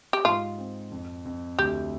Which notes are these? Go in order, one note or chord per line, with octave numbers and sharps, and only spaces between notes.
G4
G#2 F4
C4
F2
F2
D2 G4